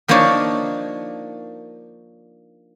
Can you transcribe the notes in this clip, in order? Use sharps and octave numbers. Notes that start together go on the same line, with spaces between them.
F3 A#3 D4 D#4 C#5 D5